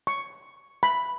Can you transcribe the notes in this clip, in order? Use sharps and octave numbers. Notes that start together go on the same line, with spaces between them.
C#6
B5